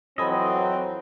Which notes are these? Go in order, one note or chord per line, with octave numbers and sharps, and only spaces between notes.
F2 E3 F#3 C4 A4 D#5 G#5 B5